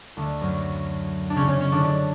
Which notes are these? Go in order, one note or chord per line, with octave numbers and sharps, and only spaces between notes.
D2 D3
F#2 F#3
D4
C#3 C#4
C#3 C#4
C#3 C#4
D3 D4
D3 D4